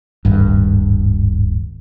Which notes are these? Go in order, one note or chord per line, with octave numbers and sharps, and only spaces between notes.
D1 G#1 G2